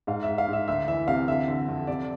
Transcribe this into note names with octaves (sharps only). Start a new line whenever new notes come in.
G#2 F5
E5
G#2
F5
G#2
E5
D2 E5
E3 E5
C3 F5
D3 E5
D3
F2
C3 D5